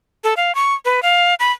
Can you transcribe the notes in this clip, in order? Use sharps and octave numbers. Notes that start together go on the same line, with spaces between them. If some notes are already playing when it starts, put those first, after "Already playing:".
A4
F5
C#6
B4
F5
B5